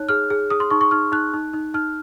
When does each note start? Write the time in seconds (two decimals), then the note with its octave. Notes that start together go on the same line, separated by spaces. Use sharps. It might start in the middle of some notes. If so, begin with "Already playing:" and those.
Already playing: D#4 C#5 F#6
0.09 G#4 F6
0.30 G#4
0.50 G#4 D#6
0.60 C6
0.70 D#4 C#6
0.81 C#6
0.91 D#4 F6
1.12 D#4 F#6
1.34 D#4
1.53 D#4
1.74 D#4 F6